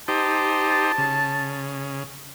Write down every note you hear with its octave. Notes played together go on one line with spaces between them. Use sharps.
D#4 G4 C5 A5
C#3